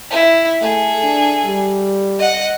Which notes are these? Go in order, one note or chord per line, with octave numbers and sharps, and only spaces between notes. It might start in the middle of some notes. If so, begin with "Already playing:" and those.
E4
A3 G#4 A4
D4
G3
D#5 F#5